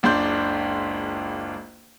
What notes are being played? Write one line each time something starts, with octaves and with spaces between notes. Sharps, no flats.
F#1 C#2 D4 C6 G6